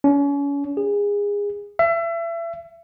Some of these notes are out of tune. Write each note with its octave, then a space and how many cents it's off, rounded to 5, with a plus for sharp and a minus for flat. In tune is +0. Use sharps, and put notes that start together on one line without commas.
C#4 +35
G#4 -25
E5 +30